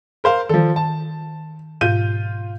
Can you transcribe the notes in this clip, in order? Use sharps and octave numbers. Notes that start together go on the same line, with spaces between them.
A#4 C5 F5
D#3 F3 A4
A5
G#2 B2 F4 G6 D#7